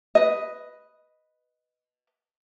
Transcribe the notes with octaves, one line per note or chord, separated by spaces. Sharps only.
B4 D#5